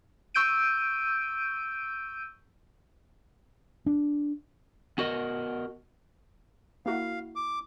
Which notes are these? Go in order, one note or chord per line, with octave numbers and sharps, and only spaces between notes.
C#6 E6 G6 D7 D#7
D4
B3 F#4 A#4 D#5
A#3 E4 F#4 F5
D6